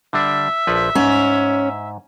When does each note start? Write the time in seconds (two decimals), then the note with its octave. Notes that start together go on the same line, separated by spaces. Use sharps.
0.13 D3 G3 D4 E5
0.67 A#1 F3 B4
0.95 G#2 C#4